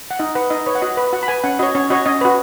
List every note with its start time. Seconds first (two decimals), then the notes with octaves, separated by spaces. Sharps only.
0.11 F#5
0.19 D#4 D#5
0.35 B4 F#5
0.50 D#4 D#5
0.66 B4 C#5
0.75 F#5
0.82 F#4 D#5
0.97 B4
1.13 F#4 F#5
1.23 B5
1.28 B4 G#5
1.44 C#4 F#5
1.59 F#4 C#5 D#5
1.75 C#4 C#5
1.90 F#4 C#5 D#5
2.06 C#4 D#5
2.21 F#4 B4